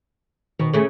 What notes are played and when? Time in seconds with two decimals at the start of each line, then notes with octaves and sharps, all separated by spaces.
0.59 B2 D#3
0.73 C#3 A3